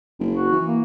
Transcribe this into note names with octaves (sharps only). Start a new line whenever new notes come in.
F#1
F#4
E3
A#3